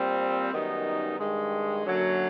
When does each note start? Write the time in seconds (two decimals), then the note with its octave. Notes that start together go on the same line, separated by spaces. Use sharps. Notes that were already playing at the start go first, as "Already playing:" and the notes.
Already playing: A#2 G3 C4
0.53 F#2 D#3 G3 B3 D#4
1.19 G2 D#3 G#3
1.84 F#2 D3 F#3 A#3